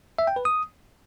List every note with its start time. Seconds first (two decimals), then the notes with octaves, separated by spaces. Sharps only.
0.19 E5
0.27 G5
0.36 B4
0.45 D#6